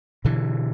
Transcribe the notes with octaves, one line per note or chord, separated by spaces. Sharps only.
B2 D3 E3